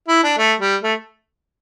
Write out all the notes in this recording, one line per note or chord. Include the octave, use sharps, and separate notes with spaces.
E4
D4
A3
G3
A3